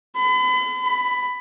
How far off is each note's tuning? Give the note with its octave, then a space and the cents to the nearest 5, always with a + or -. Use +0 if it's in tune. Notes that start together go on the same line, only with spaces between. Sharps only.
B5 +40
B5 +15